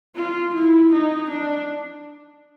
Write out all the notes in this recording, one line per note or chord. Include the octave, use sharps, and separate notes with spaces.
F4
E4
D#4
D4